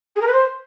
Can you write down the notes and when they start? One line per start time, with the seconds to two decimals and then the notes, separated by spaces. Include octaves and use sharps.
0.15 G#4
0.21 A#4
0.27 B4
0.32 C5